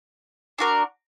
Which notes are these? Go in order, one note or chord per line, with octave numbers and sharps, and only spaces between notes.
D4 F#4 A#4